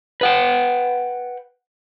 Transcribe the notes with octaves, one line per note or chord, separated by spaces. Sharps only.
B4 F#5 G5